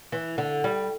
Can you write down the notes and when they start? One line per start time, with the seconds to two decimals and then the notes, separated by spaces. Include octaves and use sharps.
0.12 E3
0.38 D3
0.64 G3